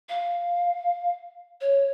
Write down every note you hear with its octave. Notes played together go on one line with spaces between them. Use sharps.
F5
C#5